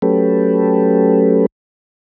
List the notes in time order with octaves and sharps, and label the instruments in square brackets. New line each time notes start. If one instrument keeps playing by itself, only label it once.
[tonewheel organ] F#3 A3 C#4 G4 A4 B4